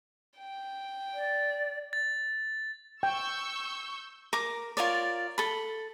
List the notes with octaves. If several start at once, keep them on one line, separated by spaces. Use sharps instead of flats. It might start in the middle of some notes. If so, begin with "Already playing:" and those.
G5
D5
A6
G5 C#6 E6 G6
A#4 D6
F4 A#4 C#5 D5
A4 B5